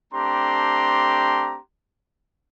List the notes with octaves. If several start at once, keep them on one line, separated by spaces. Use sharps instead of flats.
A3 C4 D4 G4 A#5 C6